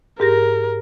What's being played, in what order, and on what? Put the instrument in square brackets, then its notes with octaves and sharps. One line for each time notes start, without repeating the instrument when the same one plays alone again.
[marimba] G#2 G4 A#6 [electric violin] A#4